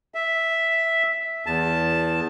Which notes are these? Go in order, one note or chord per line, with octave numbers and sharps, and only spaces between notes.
E5
E2 A5